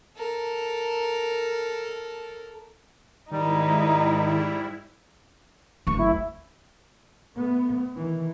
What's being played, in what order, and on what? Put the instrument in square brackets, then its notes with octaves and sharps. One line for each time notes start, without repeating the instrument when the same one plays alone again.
[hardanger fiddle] A4 A#4
[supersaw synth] G#2 E4 [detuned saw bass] D#3 [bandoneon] G3 [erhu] D#4
[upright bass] F#1 D2 [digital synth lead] C#6
[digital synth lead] E4
[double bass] A3 B3
D#3 E3